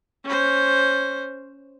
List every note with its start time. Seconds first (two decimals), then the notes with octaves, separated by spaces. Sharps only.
0.25 C#4 C5